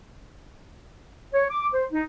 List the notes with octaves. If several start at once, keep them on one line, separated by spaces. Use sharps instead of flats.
C#5
D6
C5
D#4